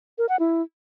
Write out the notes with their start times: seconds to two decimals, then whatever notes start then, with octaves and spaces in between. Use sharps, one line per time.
0.18 A#4
0.29 F#5
0.40 E4